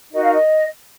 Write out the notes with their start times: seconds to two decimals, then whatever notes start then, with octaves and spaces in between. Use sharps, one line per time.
0.11 D#4 F#4 A#4 D#5
0.21 F5
0.32 D#5